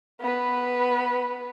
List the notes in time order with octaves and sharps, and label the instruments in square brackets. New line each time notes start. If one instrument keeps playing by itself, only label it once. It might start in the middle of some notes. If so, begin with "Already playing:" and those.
[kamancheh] B3 B4